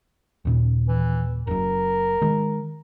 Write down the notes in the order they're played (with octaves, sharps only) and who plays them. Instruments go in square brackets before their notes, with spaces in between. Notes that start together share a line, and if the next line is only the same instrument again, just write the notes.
[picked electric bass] D#2 A#2 C#3
[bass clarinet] E3
[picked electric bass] F#1 F#2 [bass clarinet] A#4
[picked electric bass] D#3 G#3